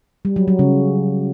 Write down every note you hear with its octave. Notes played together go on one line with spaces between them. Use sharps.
G3
F#3
F#3
C#3